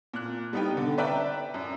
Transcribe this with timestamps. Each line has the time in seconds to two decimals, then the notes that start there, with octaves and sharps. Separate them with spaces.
0.14 A#2 F#6
0.53 G3 B3 D#4 B4 G5
0.77 D3
0.98 B4 D5 E5 G5 A#5 F#6
1.54 F#2